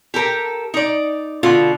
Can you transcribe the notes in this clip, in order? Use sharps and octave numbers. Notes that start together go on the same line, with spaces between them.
G4 A4 A#4
D#4 D5
B2 D3 F4